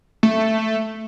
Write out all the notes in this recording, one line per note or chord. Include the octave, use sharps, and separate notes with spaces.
A3